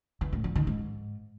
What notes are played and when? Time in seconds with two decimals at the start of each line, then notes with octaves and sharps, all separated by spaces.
0.21 E3
0.33 A2
0.44 F3
0.55 D#3
0.67 G#2